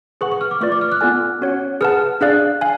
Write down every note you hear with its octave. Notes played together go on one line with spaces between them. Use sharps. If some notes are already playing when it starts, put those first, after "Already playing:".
G#4 B4 F#5 C#6
C#6
F6
D6
A3 F4 B4 D5 C#6
D6
F6
F#6
B3 F4 A4 D5 G#5
C#4 F#4 C#5 F#5
G#4 B4 F#5 A5 F6
D4 G#4 D5 F5 F#6
F5 G#5